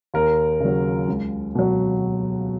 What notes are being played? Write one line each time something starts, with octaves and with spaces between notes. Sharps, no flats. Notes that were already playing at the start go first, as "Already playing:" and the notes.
D#2 A#4
C#3 F#3
C#2
B2 F#3